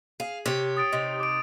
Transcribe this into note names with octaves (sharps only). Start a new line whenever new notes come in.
G#4 F5
C3 G4 C#5
D#6 A6 D7
C3 D#4 D7
D6 D7